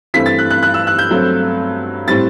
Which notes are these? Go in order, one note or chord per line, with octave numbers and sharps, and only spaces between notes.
G2 E3 A3 C4 B6
A6
F#6
F#6
F#6
E6
F#6
G6
G2 F#3 A3 C4
A2 G3 C4 A6